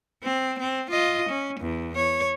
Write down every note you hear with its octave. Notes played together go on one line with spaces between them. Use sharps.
C4
C4
F4 D#5
C#4
E2
C#5